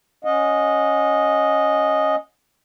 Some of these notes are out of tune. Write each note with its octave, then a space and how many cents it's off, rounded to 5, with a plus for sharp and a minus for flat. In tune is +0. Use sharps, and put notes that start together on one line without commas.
C#4 +0 D#5 +0 F#5 -40